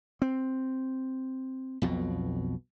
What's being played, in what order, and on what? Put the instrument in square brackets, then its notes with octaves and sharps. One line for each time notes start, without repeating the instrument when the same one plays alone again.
[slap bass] C4
B1 F2 B2